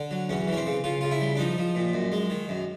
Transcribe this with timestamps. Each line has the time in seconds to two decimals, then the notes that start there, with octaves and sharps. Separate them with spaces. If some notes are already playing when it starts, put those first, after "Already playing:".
Already playing: D3
0.11 F#3
0.29 E2 C#4
0.48 E3
0.53 C#4
0.57 C4
0.66 C#3
0.84 C#3 F4
1.01 C#3 F4
1.11 E4
1.20 G3
1.36 D4
1.39 F3 D#4
1.58 F3
1.75 A#2
1.93 F#2
2.12 G#3
2.30 D#3
2.49 F#2